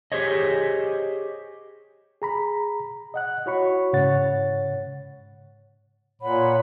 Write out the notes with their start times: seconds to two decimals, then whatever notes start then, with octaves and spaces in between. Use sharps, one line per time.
0.12 G4 G#4 C5 C#5 D#5
2.22 G#4 A#5 B5
3.14 D#5 F#5 F#6
3.46 E4 F#4 C#5 F#5 B5 C#6
3.93 G#2 C#3 C#5 F#5 A6
6.22 A#2 C#5 F#5 B5